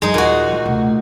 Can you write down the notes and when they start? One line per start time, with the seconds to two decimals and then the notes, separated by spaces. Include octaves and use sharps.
0.02 F#2 G#3 D#4
0.14 D#2 A#2 F#4
0.49 D#3 C4
0.66 D2 C3